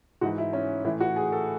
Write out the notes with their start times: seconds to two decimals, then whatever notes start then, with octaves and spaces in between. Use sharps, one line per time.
0.21 G#2 E3 F#4
0.38 E4
0.53 C#4
0.84 A2 E3 E4
1.00 F#4
1.16 G#4
1.32 A4